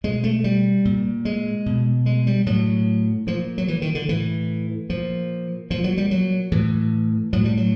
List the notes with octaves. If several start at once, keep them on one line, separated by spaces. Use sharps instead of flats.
B2 G#3
A3
G3
A#2
G#3
B2
G#3
G3
A2 F#3
A#2 F3
F#3
E3
D#3
D3
A2 E3
A#2 F3
A#2 F3
F#3
G3
F#3
A2 E3
A2 F#3
G3
F#3